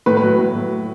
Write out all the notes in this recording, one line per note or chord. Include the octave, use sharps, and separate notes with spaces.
A2 B4
B4
F#3
A2
F#3